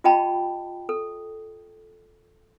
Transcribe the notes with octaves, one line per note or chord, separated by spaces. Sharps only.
F4 G4 D#5 G5 A5 B5
A4